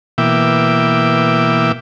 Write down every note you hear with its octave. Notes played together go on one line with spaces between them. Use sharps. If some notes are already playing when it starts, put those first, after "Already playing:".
B2 E3 A#3 E5 G5 D6